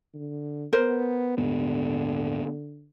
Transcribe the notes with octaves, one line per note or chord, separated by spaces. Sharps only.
D3
B3 A#4 C5
D#1 G#2 D3 B3